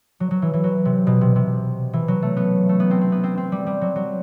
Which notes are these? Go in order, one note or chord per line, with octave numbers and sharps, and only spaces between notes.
F#3
F#3
E3
E3
F#3
C3
B2
C3
C3
E3
F#3
A3
B3
A3
B3
C4
C4
B3
C4
C4
G3
G3
F#3
F#3